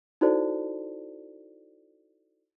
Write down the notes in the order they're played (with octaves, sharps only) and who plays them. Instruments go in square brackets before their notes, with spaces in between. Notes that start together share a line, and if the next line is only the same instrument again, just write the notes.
[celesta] D#4 E4 F#4 A4 C5 D5